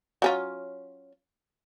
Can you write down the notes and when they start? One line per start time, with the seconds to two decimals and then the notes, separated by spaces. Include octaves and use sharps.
0.22 F#3 C#4 F4